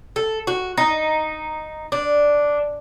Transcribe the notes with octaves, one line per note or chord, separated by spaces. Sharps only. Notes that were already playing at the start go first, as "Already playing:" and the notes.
A4
F#4
D#4
D4